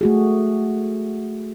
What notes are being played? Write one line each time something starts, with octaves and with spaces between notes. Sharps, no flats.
A3 F#4 G#4